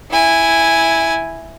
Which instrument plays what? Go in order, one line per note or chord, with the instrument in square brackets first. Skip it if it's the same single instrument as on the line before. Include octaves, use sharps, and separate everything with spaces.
[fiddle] E4 G#5